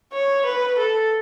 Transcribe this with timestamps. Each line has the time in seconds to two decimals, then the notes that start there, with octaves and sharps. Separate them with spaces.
0.12 C#5
0.45 B4
0.79 A4